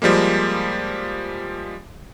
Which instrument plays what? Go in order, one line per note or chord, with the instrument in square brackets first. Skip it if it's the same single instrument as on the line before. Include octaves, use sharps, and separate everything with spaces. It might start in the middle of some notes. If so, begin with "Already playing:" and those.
[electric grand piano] F3 G3 G#3 A#3